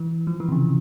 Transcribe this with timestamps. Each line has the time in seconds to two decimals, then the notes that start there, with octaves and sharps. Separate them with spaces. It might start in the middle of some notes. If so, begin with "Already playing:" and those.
Already playing: E3
0.27 F3
0.40 E3
0.48 C3
0.52 C#3